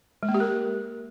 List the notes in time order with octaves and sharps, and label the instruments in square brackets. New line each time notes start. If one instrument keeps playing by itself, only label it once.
[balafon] G#3
A#3
G4
A#4